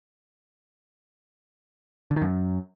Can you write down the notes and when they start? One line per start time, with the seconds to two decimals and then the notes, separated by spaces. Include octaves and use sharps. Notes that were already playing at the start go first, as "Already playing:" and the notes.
2.11 D3
2.16 D#3
2.22 F#2